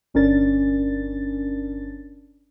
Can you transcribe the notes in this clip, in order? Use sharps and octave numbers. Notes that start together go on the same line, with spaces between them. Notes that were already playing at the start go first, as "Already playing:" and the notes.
G1 C#4 D4 A#4 A6